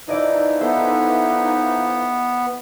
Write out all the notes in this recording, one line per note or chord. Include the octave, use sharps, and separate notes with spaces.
E3 F3 D#4 E4 D5 D#5
B3 A4 C5 E5